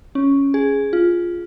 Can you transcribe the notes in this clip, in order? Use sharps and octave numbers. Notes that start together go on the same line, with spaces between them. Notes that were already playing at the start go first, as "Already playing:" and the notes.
C#4
G#4
F4